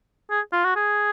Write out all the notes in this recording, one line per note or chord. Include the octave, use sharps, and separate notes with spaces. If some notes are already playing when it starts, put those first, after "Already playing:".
G#4
F4
F#4
G#4